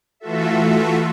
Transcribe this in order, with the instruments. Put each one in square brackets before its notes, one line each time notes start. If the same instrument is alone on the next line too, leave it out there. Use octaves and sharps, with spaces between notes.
[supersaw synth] E3 A3 F4 F#4 A4 E5